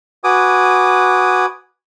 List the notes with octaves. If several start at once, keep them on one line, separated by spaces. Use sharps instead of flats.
F#4 B4 G#5 D6 D#6